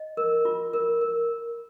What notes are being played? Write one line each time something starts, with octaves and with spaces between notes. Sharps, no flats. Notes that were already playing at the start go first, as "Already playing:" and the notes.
Already playing: D#5
A#4
F4
A#4
A#4